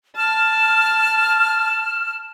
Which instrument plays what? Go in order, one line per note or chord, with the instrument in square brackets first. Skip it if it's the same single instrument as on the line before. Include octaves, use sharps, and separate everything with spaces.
[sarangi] A5 [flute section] F6 [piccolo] E7